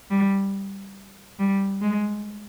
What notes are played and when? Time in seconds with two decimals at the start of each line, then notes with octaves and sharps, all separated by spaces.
0.10 G3
1.39 G3
1.81 G#3